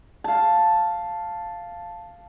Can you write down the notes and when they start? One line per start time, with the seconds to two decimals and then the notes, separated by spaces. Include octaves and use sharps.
0.24 F5 A5